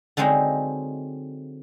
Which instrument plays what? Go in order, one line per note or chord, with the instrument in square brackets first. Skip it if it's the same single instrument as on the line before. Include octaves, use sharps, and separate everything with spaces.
[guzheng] D3 F#3 G#3 C4 D#4